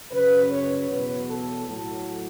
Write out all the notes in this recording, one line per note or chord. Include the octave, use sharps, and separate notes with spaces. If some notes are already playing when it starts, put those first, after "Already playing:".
F#2 C#3 F#3 B4
C#5
E2 B2 F#3 B4
A4
A2 F#3 A4